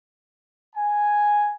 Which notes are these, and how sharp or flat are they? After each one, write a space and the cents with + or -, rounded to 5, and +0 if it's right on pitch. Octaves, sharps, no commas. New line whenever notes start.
G#5 +0